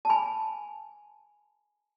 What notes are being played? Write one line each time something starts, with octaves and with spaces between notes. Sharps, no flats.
A5
G#5 B5